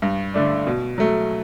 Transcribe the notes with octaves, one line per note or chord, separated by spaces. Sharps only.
G2
D3 A3 D4
B2
F#3 A3